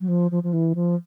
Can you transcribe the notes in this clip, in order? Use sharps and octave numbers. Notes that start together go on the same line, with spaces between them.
F#3
F3
F3
F3
E3
F3